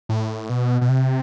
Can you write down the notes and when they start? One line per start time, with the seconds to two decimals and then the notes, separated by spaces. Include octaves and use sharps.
0.09 A2
0.49 B2
0.81 B2
0.89 C3